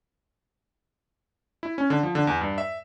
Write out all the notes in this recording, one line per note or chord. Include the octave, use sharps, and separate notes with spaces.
E4
C#4
D3
F3
D3
E2
G2
E5